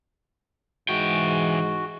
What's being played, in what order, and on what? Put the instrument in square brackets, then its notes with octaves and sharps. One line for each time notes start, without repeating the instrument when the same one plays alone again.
[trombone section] G#2 G#3 [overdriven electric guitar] E3 G5 [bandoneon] F#4